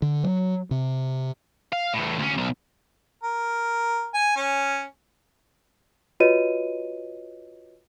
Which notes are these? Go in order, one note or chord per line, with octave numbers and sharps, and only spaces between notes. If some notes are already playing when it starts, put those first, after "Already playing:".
D3
F#3
C3
F5
E2 A2
D2 C#4
B1
A#4
G#5
C#4
F4 F#4 B4 C#5 D#5 D#7